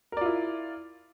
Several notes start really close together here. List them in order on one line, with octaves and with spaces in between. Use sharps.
A#4 D5 F4 E4